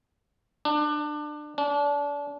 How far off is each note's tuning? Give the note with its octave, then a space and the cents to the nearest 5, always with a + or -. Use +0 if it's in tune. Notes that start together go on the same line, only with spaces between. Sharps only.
D4 +25
D4 -30